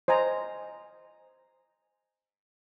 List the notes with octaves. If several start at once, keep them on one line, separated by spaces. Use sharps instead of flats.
C5 D#5 G#5 A#5